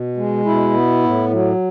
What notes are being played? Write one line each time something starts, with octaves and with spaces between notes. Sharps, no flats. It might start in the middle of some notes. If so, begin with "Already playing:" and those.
Already playing: B2
G#3
B2 E4
B3
A2
F#3